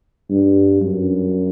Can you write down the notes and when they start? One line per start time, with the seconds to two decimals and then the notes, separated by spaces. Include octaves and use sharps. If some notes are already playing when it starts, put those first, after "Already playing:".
0.30 G2
0.82 F#2